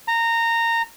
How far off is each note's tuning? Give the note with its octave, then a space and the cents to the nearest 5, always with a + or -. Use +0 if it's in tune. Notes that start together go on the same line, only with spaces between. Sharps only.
A#5 -20